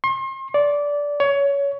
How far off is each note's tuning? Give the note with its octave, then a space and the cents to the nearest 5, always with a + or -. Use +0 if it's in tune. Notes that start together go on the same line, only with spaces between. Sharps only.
C6 +40
D5 -15
C#5 +20